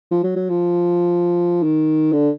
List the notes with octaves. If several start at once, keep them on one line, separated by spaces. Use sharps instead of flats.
F3
F#3
F#3
F3
D#3
D3